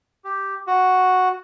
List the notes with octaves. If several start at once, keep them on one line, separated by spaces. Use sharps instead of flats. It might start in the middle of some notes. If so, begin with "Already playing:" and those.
G4
F#4